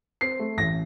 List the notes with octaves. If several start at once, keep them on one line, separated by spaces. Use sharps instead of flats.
C4 C7
A3
A1 A#6